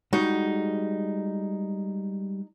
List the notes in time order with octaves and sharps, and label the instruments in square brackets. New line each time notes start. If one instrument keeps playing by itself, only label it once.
[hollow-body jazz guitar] G3 G#3 F#4 [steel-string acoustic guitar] D#4